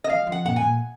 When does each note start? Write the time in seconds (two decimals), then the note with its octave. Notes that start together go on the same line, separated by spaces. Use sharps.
0.04 D#5
0.09 F#3 F5
0.27 F3
0.32 F#5
0.45 A#2 F#5
0.56 G#5
0.62 A#2